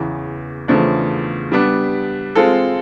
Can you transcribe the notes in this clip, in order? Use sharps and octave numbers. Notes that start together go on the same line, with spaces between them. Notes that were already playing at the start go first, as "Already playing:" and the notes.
Already playing: E2 C#3 E3
E2 C#3 F3 A3 D4
G3 B3 D4
G#3 C4 F4 A4